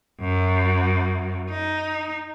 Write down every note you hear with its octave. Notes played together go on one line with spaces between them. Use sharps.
F#2
D#4